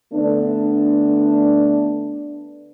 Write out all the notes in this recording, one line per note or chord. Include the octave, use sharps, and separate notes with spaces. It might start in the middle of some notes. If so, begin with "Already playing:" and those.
D3 A3 B3 D4